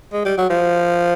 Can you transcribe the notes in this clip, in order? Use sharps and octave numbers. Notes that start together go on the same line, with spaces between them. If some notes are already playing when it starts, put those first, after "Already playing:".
G#3
G3
F#3
F3